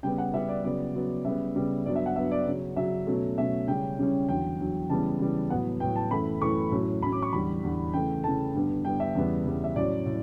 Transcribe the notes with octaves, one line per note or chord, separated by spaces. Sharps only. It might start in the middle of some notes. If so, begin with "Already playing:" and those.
C#3 G3 B3 G5
F#5
C#3 G3 B3 E5
D5
C#3 F#3 B3 D5
C#3 F#3 B3
C#3 G3 B3 E5
C#3 G3 B3
G2 F#3 B3 D5
E5
F#5
G2 F#3 B3 E5
D5
C#3 F#3 C#4
C#3 F#3 C#4 E5
B2 F#3 A3 C#4
B2 F#3 A3 C#4 E5
C#3 G3 C#4 G5
C#3 G3 C#4
E2 D3 F#3 G5
E2 D3 F#3
C#3 E3 G3 B3 A5
C#3 E3 G3 B3
A2 F#3 B3 F#5
A2 F#3 B3 G5
A5
F#2 E3 A3 B5
F#2 E3 A3 C#6
A2 F#3 C#4
A2 F#3 C#4 B5
D6
C#6
E2 D3 G3 B5
E2 D3 G3
C#3 E3 A3 G5
C#3 E3 A3 A5
G2 D3 G3 B3
G2 D3 G3 B3 G5
E5
E2 C#3 G3 B3
E2 C#3 G3 B3
E5
A2 F#3 C#4 D5
A2